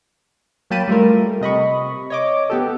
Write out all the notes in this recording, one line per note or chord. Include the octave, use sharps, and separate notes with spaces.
F#3 A#3 G5 A5 B5 D#7
G3 A3 F4 A#4
C3 D#5 B5 C#6
C#5 D#5 D6
B3 G4 A4